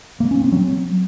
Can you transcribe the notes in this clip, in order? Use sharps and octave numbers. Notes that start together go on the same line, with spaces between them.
A#3
C#4
C4
F#3